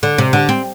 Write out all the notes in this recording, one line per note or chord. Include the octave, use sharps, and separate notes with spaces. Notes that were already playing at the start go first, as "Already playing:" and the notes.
D3
C3
D3
C4